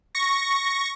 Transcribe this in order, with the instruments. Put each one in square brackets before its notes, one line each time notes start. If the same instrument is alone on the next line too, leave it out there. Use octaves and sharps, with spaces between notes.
[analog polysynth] C#6 A#6